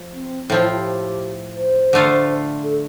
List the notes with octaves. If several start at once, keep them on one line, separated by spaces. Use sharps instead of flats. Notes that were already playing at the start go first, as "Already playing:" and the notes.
Already playing: F3
C4
A2 F3 C4
F4
G4
C5
D3 A3 F4
A4